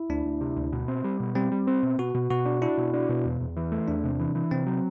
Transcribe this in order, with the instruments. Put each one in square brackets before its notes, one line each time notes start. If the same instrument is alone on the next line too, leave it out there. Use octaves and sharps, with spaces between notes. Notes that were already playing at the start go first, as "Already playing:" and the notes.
Already playing: [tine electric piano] E4
[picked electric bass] D2 [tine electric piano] D4
[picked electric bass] D2
C3
D2
B2
C4
G3
B2
[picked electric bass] G3 [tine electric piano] C4
[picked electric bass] G3
C4
B2
[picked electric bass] B2 [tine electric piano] F#4
[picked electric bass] B2
[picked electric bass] B2 [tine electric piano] F#4
[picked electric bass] D4
[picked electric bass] D4 [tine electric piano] E4
[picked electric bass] B2
D4
B2
E2
E2
E3
A3
[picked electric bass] E2 [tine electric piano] D4
[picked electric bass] C3
E3
E3
[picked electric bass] C3 [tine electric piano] C4
[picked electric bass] F#3